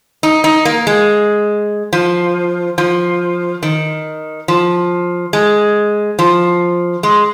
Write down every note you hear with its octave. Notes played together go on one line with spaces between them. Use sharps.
D#4
D#4
A#3
G#3
F3
F3
D#3
F3
G#3
F3
G#3